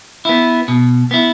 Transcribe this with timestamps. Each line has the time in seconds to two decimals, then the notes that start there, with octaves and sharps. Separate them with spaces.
0.25 B3 E4
0.68 B2
1.11 B3 E4